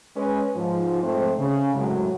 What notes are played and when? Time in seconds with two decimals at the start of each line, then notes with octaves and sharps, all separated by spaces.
0.16 G#3 C#4 B4
0.56 G#2 F3
1.03 G#2 A3 C4 C5
1.39 C#3
1.75 F#2 A2 C3 F#3 G#3